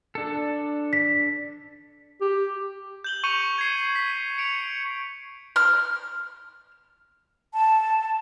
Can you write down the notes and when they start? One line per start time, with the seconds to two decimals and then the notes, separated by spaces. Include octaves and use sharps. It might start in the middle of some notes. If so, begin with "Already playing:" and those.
0.15 D4 A4
0.93 B6
2.21 G4
3.04 G6 F#7 G7
3.24 C#6 C#7 D#7 F7
3.58 G#6 C7
3.95 B6
4.38 C#7 D7 F7
5.56 F6
7.54 A5